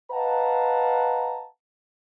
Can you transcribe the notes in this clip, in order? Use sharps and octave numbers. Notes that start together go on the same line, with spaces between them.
B4 D#5 F5 F#5 A5 A#5